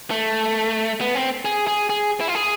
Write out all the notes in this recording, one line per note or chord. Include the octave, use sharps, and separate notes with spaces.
A3
B3
C4
G#4
G#4
G#4
E4
F4
G#4